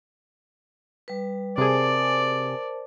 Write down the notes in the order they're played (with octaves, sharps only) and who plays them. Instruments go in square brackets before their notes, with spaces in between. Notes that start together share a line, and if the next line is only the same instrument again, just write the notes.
[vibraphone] G3 B4
[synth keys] C3 G#4 [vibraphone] A#4 C5 A5 [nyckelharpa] D5